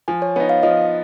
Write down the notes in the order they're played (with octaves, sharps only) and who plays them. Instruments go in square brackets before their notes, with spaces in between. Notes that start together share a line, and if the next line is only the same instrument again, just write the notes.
[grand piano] F3 [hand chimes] G#5
[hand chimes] C#5
[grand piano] B3 [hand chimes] C#5
[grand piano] D#4
[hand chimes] F5
[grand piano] F3 [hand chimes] D#5